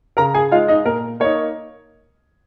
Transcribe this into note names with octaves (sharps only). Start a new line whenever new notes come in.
C#3 A#4 A#5
G#4 G#5
G#3 D#4 F4 F5
D#4 D#5
A#2 A#4
A#3 D#4 C#5